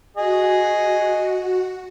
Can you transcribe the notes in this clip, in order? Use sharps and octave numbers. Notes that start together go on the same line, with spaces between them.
F#4 G#4 D#5